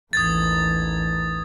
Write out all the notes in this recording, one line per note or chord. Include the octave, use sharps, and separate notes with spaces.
A1 D#2 D#6 G#6 A6